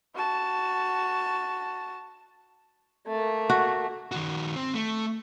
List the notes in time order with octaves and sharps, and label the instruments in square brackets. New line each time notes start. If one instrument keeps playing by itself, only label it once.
[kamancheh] F#4 A5
[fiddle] A3 A#3
[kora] F#4
[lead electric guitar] D#3 F#4
C4
A3